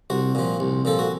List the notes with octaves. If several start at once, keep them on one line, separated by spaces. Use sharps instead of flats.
C2 F#4
A#2 F3
C2
A#2 F3 A4
F#4